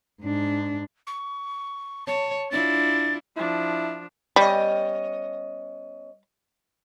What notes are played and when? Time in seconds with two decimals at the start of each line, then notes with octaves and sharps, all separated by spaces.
0.22 G#2 D4
1.07 C#6
2.07 C#5 A5
2.51 D4 E4 F4 A6
3.36 F3 D4 E4
4.36 G3 B3 C#4 D#5